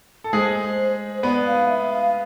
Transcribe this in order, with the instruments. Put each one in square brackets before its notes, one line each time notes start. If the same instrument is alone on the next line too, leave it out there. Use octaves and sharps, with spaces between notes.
[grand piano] A4
[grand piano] G#3 G#4 [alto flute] C5
[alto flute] C5
[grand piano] B3 B4 [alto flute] D5
[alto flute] F5
E5
F5